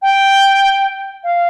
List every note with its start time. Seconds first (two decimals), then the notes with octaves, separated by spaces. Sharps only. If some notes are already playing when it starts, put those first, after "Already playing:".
0.02 G5
1.24 F5